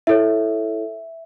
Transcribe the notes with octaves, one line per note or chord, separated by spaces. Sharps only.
E4 A4 C#5 E5